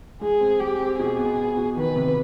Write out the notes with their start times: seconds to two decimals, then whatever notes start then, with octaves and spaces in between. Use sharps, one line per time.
0.21 G#3 G#4
0.40 C4
0.60 G#3 G4
0.80 C4
0.99 B2 G#4
1.19 B3
1.37 B3
1.57 B2
1.77 D#3 B4
1.96 C3